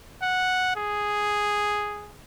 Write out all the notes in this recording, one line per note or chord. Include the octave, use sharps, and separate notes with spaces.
F#5
G#4